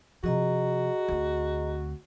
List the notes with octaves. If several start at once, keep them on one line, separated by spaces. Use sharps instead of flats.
C3 F3 F#4 G#4 D#5 A#5
D2 C4